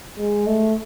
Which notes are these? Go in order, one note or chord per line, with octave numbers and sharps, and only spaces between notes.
G#3
A3